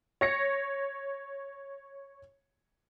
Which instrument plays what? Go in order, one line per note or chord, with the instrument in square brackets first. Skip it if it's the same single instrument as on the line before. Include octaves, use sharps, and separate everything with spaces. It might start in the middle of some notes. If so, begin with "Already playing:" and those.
[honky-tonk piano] C#5 A#6 C#7